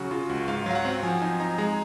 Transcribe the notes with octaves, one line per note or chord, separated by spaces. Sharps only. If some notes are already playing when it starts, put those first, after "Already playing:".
Already playing: C#3 F#3 F#4
C#3 F4
C#2 F#4
G#2 F5
F#3 F5
F#5
C4
F3 G#5
D#4 G#5
D#4 A#5
G#3 A#5